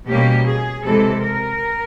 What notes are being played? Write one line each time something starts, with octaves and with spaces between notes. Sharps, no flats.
B2 G3 A#3 C#4 G4
G#4
C3 E3 G#3 A4
A#4